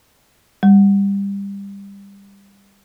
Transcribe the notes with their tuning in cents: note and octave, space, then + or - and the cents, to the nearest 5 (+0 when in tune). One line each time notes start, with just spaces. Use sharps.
G3 +25